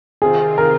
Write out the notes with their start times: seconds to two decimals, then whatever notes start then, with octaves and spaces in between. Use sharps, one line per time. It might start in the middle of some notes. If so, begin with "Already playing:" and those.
0.22 C3 D#3 C4 F4 G#4
0.58 A#4